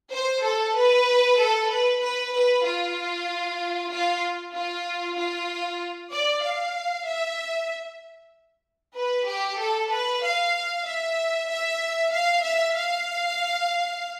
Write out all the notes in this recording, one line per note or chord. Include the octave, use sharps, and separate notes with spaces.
C5
A4
B4
A4
B4
B4
B4
F4
F4
F4
F4
D5
F5
E5
B4
G4
A4
B4
F5
E5
E5
F5
E5
F5